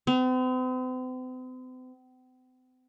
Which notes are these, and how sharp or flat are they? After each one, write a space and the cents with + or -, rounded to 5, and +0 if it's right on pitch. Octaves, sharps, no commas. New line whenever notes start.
C4 -45